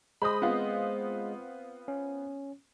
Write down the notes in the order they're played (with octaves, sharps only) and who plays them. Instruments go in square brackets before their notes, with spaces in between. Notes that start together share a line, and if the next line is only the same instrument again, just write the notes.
[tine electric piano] G#3 C5 D#5 [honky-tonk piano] B5 D#6
[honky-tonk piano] B3 C4 F4
[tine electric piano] C#4